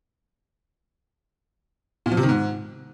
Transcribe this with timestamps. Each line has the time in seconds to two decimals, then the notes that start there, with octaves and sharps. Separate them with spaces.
2.06 A#2
2.12 F3
2.17 C3
2.23 D#3
2.29 G#2